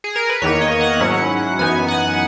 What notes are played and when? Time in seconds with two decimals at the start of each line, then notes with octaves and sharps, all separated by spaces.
0.04 G#4
0.16 A#4
0.30 B4
0.42 E2 D#3 A#3 C#5
0.61 D#5
0.81 F#5
1.00 G#2 F#3 C#4 E4
1.59 F#2 E3 B3 D#4 G#5
1.88 F#5